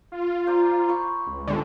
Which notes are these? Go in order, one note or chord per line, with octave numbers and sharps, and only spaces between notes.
F4
C5 D5 A#5
B5 C#6
C#2
G#1 D3 G5 G#5